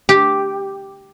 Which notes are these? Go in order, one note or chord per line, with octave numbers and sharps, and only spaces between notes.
G4